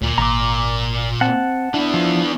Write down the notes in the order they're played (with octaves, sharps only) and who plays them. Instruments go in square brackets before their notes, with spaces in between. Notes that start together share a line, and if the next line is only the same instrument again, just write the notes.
[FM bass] D2 [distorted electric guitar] A#2
[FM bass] G#1 [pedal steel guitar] A#5 D6
[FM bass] C4 [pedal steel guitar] F#5 A5
[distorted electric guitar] E3 B3 [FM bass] D4
[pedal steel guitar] F3